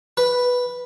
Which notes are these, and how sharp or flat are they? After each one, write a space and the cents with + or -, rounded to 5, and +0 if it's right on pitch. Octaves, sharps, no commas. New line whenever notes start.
B4 -5